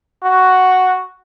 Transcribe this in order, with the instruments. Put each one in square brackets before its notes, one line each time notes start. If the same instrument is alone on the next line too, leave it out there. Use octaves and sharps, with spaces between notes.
[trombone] F#4